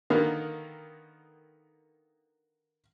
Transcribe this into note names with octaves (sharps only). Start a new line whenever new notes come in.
D3 D#3 A#3 B3